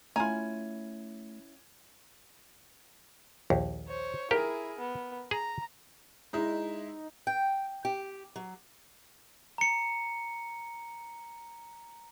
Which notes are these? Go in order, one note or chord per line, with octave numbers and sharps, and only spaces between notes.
A3 C#4 E4 F4 G#5 A#5
A#1 D#2
C5 C#5
E4 G4 G#4 A#4
B3
G#4 A#5
G#3 D#4 E4
G5
G4
F#3
A#5 C#7